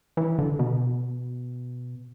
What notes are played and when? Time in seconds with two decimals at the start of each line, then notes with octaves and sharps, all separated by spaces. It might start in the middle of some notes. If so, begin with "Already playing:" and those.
0.17 E3
0.39 D3
0.59 B2